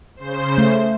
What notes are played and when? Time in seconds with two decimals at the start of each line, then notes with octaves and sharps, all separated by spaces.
0.16 C#3 C5
0.58 A3